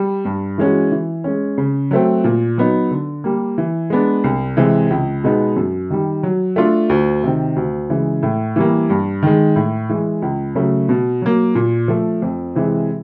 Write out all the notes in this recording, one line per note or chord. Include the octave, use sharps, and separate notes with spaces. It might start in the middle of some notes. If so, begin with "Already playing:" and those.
Already playing: G3
G2
E3 G#3 C#4 F#4
E3
G#3 C#4
C#3
F#3 A3 C4
A#2
F#3 B3 D#4
D3
G3 A#3
E3
G#3 B3 D4
C2
C3 E3 G#3
C#2
B2 G#3 B3 D#4
F#2
D#3 G3
F#3
A3 D4 F4
D2
C3 D#3
D2
C#3 E3 G#3
A2
E3 G3 A#3
G2
D#3 G#3
A2
E3 G#3
C#2
C#3 F#3 A3
B2
F#3 A#3
A#2
F3 A3
F2
C3 E3 G#3